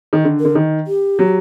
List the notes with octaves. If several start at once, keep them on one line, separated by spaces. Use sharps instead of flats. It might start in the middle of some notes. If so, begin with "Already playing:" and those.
D#3
D3
D3 A#4
D#3
G4
F#3